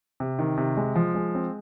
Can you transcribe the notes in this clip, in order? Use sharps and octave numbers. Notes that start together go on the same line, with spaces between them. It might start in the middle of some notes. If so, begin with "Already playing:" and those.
C3
D#3
C3
G#3
F3
G#3
C4